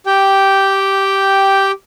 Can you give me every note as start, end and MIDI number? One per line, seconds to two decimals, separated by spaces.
0.06 1.72 67
0.06 1.72 79